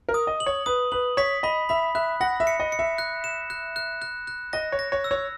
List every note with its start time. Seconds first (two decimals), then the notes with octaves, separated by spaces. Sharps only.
0.09 A#4
0.14 D#6
0.27 D#5
0.40 F#7
0.46 C#5
0.66 B4 D#6
0.92 B4 F#7
1.17 C#5 B6
1.43 D#5 B5
1.69 E5 B5
1.95 E5 F#6
2.21 F#5 A#6
2.40 E5
2.47 C#7
2.60 D#5
2.72 C#7
2.79 E5
2.98 F#6
3.24 E7
3.50 F#6
3.76 F#6
4.02 F#6
4.27 F#6
4.53 D#5 A#6
4.72 C#5
4.79 A#6
4.92 C#5
5.04 E6
5.11 C#5